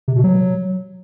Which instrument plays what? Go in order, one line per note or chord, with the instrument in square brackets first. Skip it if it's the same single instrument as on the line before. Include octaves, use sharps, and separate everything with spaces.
[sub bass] C3
B2
F#3